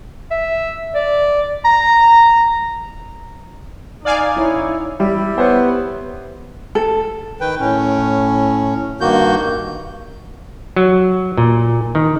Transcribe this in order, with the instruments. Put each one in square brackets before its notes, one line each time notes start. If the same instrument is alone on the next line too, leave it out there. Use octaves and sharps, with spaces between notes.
[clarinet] E5
D5
A#5
[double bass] D#4 [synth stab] D5 F5 G#5
[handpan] E4 C#5
[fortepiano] G3 [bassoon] E4
[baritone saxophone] B3 [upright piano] G4 C5 C#5
[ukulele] A4
[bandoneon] D#3 B4 G5
A2 C#4
G2 D#3 A#3 F#4 G6
[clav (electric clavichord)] F#3
A#2
D#3